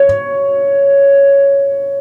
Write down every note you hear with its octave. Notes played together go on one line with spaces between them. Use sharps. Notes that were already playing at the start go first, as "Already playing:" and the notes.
Already playing: C#5